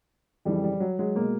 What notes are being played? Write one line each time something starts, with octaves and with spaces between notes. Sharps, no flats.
F2 C#3 E3 G3
G3
F#3
F#3 G#3
B2 G#3 A#3